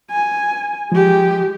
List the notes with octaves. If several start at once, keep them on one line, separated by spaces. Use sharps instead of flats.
G#5
F3 G#3 G4